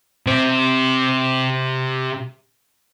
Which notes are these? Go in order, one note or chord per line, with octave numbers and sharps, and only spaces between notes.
C3 C5